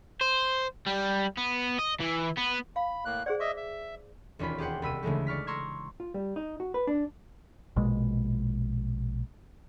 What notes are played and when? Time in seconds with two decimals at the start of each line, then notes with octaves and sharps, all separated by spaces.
0.21 C5
0.86 G3
1.37 B3
1.78 D#5
2.00 E3
2.37 B3
2.76 F5 B5
3.05 A2 A#3 F#6
3.26 G#4 C5 D5 F#5
3.40 D#5 E5 D6
3.57 E5
4.39 E1 D#2 C#4 F4 B5
4.58 G4 G#4 C5 F#5 G5
4.82 C2 B5 E6 D#7
5.03 D2 C#3 E3 G#3 A3
5.27 D5 C#6 F6 B6
5.47 A#5 C6 C#6 E6 G#6
6.00 F4
6.14 G3
6.36 D#4
6.60 F#4
6.74 B4
6.87 D4
7.76 A#1 B2 G#3